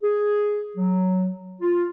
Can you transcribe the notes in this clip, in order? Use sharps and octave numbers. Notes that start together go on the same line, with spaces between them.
G#4
F#3
F4